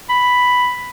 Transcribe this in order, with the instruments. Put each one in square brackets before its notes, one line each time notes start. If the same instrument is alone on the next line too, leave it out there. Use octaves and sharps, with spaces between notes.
[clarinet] B5